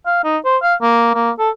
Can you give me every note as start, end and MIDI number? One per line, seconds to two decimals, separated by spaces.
0.06 0.21 77
0.24 0.37 63
0.45 0.57 72
0.62 0.74 77
0.82 1.09 58
1.14 1.31 58
1.39 1.50 69